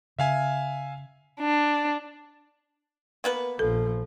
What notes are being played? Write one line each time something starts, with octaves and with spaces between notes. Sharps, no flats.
C#3 E5 F5 G#5
D4
A#3 B3 B4
A#1 F3 A4